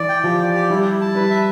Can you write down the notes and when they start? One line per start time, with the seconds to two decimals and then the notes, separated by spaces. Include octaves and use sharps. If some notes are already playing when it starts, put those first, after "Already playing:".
Already playing: E3 D5
0.09 G5
0.24 F3 G4
0.39 D5
0.54 G4
0.70 G3 E4
0.84 E4
1.01 A5
1.15 G3 B4
1.30 E5